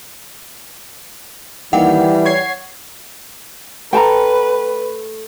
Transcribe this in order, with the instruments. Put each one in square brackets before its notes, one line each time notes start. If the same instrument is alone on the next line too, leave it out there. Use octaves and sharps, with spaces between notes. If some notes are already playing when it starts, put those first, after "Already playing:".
[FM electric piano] D#3 A#3 G4 [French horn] E3 [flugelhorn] G3 [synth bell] F#5
[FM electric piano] C#5 G#6 C7
[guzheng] A3 [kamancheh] B4 [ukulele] G5 A5 A#5